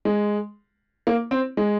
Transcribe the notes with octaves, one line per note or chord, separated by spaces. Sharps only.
G#3
A#3
C4
G#3